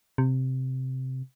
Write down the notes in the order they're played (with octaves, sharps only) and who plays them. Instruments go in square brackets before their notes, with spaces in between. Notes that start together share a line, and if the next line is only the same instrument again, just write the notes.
[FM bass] C3